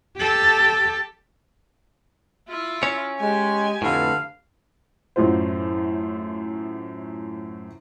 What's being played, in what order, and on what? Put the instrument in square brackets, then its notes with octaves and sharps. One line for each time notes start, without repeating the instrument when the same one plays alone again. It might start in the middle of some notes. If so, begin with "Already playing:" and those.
[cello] G4 A4
[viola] E4 F4
[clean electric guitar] C#4 C#5
[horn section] G#3 [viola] G4 G#5
[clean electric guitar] F2 A2 [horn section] D3 A3 B4 [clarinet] F5
[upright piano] F#2 A2 F4 C5